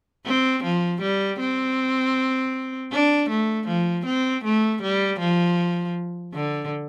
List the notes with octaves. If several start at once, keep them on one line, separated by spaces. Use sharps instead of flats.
C4
F3
G3
C4
D4
A3
F3
C4
A3
G3
F3
D3